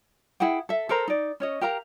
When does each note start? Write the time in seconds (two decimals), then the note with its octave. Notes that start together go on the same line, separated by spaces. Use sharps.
0.40 E4 G#4 F#5 G5
0.69 A4 E5
0.89 A4 A#4 C5 A#5
1.08 D#4 D5
1.40 C#4 C#5 D#5
1.61 G4 A#4 F5 A#5